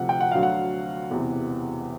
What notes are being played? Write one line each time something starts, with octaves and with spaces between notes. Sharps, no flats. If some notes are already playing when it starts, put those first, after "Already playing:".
Already playing: D2 C3 F3 F#5
G5
F#5
D2 D3 F#3 F5
F#5
E1 E2 C3 E3